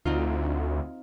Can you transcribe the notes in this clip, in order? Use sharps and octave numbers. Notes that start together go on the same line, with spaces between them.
D2 C4 D#4 F4